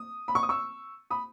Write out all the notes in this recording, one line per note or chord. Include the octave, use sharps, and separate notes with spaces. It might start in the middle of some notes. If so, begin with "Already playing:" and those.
Already playing: D#6
B5
C#6
D#6
C#6 E6
B5 D#6